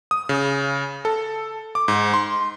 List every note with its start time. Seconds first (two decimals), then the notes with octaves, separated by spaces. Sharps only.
0.11 D#6
0.29 C#3
1.05 A4
1.75 D6
1.88 G#2
2.14 C6